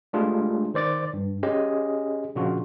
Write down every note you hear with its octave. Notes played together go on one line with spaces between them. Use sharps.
G#3 A3 D4 F4 G4 G#4
D#3 C5 D5 D6 A6
G2
C#4 G4 G#4 D#5
A#2 C#3 F3 D4 F4 F#4